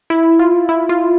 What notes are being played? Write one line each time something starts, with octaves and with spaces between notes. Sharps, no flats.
E4
F4
E4
F4